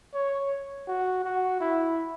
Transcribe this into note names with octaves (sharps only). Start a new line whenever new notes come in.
C#5
F#4
F#4
E4